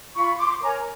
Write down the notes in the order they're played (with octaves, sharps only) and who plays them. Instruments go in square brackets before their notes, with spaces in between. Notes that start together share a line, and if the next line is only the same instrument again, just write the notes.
[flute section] F4 B5 C#6
C6 D6
A#4 C#5 G#5 A#5